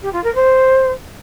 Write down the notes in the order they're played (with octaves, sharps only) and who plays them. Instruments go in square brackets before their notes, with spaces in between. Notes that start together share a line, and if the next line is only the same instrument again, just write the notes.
[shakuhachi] G4
F4
A#4
C5